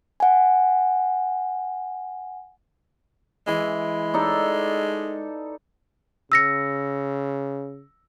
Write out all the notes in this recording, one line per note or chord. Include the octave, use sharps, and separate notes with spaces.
F#5 G#5
E3 G#3
D#4 A4 D5
C#3 E6 A#6 C#7